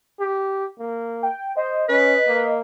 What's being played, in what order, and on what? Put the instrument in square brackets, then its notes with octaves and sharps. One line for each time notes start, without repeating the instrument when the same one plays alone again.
[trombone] G4
A#3
[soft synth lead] G5
[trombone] C5 [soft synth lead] D#5
[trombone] C#4 [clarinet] B4
[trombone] A#3